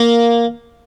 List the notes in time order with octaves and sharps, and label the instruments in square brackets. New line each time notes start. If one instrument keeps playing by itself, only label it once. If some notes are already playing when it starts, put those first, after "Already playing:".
Already playing: [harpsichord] A#3